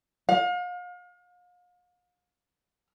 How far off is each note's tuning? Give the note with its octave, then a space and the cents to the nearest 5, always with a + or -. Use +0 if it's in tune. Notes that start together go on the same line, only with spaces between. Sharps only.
F5 +40